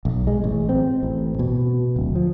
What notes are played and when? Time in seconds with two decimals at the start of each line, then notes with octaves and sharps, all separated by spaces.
0.05 B1
0.27 G#3
0.44 A1
0.69 C4
1.03 A1
1.39 B2
1.96 D1
2.15 F3